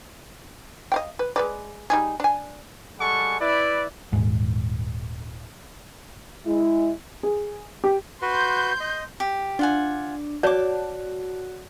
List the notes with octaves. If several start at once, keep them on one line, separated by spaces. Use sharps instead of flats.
D#5 F5 G5
B4
G#3 B4 D5
G3 D#4 G#4
D4 G#5
G3 G#3 A4 F#5 G#5 C#6
E4 B4 D5
D#1 G#2
G#3 E4
G#4
G4
F#4 B4 C6 G6
D#5
G4
D4 F4 F#5 G#5
F#4 C#5 D5 A5 D6